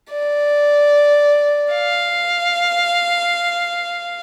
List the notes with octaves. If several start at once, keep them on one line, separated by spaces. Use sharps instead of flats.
D5
F5